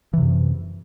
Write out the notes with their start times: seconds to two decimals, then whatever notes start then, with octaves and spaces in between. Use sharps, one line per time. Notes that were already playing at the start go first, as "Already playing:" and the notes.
0.13 E3
0.18 C3
0.22 F#2